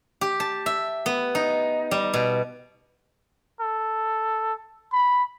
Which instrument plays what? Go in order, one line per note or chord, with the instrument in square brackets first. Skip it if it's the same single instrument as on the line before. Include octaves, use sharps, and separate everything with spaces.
[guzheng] G4
A5
E5
B3
D#4
G3
B2
[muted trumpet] A4
B5